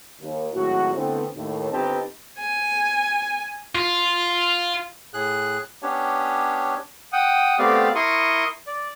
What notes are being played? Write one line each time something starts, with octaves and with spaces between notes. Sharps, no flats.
D#2
G#1 A2 F#3 F#4
D3 E3 A3 B3 C4
D#2 A2
G1 C4 D#4 G4 B4 A5
G#5
F4
A2 G#4 F#6
B3 C#4 D4 G4 C#5
F#5 G5 D#6
A3 B3 C4 G4 D5 F5
E4 A#4 C6 C#6 D#6
D5